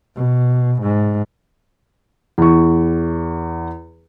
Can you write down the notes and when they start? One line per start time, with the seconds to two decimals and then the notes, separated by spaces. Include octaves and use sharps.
0.16 B2
0.82 G#2
2.38 E2 C#6